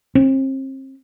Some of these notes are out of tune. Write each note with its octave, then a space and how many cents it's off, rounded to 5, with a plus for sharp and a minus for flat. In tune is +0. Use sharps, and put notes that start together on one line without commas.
C4 +35